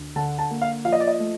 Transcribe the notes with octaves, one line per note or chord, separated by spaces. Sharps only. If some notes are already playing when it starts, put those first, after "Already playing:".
Already playing: D2
D3 A5
A5
A#3
F5
F3 F5
D#5
D5
D#5
A3